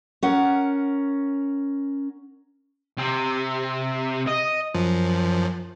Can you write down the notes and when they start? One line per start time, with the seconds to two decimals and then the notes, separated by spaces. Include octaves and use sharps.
0.23 C#4 A#4 F#5
2.98 C3
4.27 D#5
4.74 F#2 F3